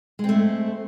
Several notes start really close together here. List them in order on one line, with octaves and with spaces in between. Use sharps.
G#3 C4 A3